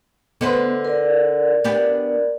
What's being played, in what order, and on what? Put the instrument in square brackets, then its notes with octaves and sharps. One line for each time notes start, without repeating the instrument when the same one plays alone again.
[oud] D3 B4 C5 [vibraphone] B3 D#5
[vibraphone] A#4 D5
[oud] B3 D4 G4